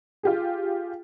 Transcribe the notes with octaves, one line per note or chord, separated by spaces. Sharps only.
F4 G4 G#4